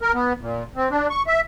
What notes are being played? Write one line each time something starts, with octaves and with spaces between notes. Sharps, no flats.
A#4
B3
A#2
C4
D4
C#6
E5